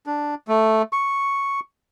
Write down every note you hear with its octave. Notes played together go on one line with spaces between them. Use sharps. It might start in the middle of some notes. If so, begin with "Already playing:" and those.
D4
A3
C#6